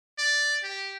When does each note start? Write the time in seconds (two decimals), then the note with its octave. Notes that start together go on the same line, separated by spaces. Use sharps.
0.18 D5
0.63 G4